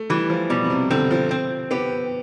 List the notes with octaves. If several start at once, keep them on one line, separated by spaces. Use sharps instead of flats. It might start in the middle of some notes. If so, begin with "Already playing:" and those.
Already playing: A3
E3 G3
F3
B2 G3
B2
C3
D3 C4
F3
C4
B3 G4